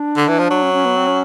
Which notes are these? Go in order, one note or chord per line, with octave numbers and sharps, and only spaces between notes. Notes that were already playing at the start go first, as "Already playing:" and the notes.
Already playing: D4
D3
E3
F3
F#3
C#4
C#4
B3
C4
C#4